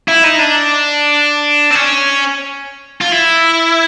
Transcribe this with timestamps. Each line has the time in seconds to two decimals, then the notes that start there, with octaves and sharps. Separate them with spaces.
0.08 E4
0.24 D#4
0.39 D4
1.71 C4
1.75 C#4
3.01 F4
3.12 E4